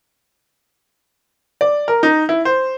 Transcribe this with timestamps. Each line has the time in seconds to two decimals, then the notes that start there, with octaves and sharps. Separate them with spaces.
1.61 D5
1.88 A#4
2.03 D#4
2.29 E4
2.45 C5